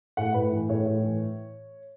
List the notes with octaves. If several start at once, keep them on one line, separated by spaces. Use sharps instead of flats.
A2 F#5
A2 B4
E3
A2 C#5
A2
E3